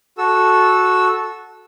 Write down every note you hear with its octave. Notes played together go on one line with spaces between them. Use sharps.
F#4 A4 E6